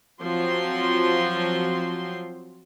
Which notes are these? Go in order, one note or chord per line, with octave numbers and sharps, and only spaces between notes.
F3 F#3 C4 C6